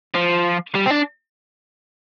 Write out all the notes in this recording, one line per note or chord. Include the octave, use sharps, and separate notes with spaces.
F3
G3
C4
D4